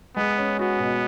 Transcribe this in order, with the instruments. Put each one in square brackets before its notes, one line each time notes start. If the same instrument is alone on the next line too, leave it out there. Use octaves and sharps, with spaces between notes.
[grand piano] G#3 [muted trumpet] B3
[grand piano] C#4
[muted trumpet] B3 [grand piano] F#4
[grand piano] B2